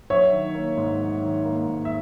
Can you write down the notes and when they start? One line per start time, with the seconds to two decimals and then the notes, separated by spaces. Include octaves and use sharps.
0.10 F#3 C#5 E5
0.33 D#3
0.54 A#3
0.77 G#2
1.00 F#3
1.23 D#3
1.45 A#3
1.67 G#2
1.85 E5